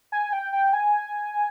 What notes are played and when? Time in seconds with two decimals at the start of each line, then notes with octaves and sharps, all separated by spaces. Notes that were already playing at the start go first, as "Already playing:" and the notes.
0.12 G#5
0.33 G5
0.53 G5
0.73 G#5